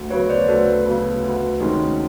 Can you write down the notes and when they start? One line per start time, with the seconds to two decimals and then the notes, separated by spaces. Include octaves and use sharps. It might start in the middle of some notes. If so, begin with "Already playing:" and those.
Already playing: D2
0.10 C#3 F#3 B3 B4 C#5
0.29 C5 D5
0.48 D2 A4 B4
0.85 C#3 F#3 B3
1.24 D2
1.60 C3 D#3 G#3 C#4